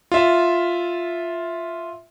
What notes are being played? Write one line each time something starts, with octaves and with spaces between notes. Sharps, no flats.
F4 E5